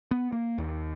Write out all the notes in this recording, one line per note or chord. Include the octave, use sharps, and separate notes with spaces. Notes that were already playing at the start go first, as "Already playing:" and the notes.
B3
A#3
D#2